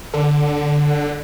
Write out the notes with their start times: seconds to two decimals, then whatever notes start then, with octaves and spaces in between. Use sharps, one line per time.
0.14 D3